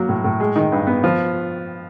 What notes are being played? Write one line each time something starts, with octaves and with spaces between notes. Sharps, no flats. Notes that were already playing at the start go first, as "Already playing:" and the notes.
Already playing: F#3 A#3
A2
A2
G#3
D#3
G2
B3
F3